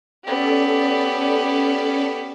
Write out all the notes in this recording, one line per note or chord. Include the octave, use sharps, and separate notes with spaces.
B3 C#4 G4 A4 D5